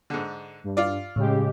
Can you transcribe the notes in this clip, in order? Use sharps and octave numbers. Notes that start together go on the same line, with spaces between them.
G#2 D3
G2
F4 D5
A2 C#3 G#3 G4